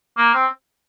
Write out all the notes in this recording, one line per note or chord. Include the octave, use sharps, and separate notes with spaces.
A#3
C4